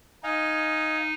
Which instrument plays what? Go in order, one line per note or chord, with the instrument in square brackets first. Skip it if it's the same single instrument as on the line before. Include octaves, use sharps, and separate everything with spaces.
[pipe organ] D#4 [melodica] D#5 F5 G#5